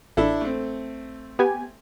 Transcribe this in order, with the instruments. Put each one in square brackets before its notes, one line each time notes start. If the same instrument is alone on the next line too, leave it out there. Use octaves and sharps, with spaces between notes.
[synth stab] A1 [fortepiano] D4 E4 A4
[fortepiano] A3 C4
[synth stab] B3 G4 G#5